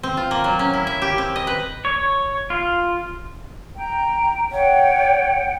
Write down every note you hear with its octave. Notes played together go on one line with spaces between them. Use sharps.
C4
F4
A#3
F#3
C#4
E4
E5
G4
C4
D#5
B4
C#5
F4
G5 A#5
C#5 F#5 G5